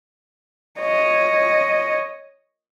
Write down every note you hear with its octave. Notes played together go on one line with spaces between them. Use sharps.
C#5 D#5